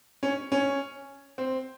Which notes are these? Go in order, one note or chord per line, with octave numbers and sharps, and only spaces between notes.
C#4
C#4
C4